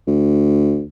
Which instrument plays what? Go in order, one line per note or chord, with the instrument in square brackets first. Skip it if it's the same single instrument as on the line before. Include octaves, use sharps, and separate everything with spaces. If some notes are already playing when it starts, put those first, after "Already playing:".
[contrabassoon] D2